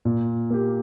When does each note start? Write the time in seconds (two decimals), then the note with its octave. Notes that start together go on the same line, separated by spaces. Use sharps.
0.05 A#2
0.50 A#3 G4